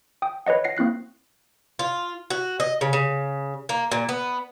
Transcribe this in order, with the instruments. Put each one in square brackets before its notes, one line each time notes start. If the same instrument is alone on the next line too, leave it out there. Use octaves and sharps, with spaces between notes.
[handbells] G5 D#6
B4 C#5 D#5 F#5
F#5 A#6 C7 C#7
A#3 C4 E4 F#6 C7
[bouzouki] F4
F#4
D#5
C#3
C#3
A#3
A#2
B3